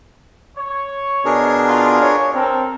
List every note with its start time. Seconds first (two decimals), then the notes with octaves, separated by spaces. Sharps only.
0.56 C#5
1.25 B2 D4 G#4 A#4
1.67 D#4 F4
2.03 C#5
2.34 C4 A4 A#4 A#5